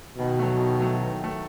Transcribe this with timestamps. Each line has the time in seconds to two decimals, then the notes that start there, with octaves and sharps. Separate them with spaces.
0.18 B2 D#3
0.39 F#3 A3
0.60 D#3
0.80 F#3 A3
1.01 D#3
1.21 F#3 A3